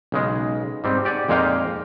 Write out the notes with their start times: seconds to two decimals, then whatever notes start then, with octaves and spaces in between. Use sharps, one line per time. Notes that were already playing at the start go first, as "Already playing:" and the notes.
0.12 B1 C#3 G#3
0.84 G#2 G3 C4
1.05 G4 D5 F#5 G#5
1.29 F2 A#2 G#3 D#4 F5 G5